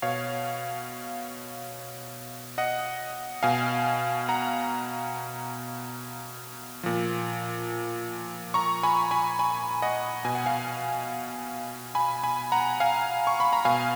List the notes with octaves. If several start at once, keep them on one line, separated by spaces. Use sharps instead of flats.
B2 C#5 F5
D#5 F#5
B2 F5 G#5
F#5 A#5
A#2 F3
A#5 C#6
G#5 B5
G#5 B5
G#5 B5
D#5 F#5
B2 G#5
F#5
F5 G#5
G#5 B5
G#5 B5
F#5 A#5
F5 G#5
C#6
B5
A#5
B2 F5 G#5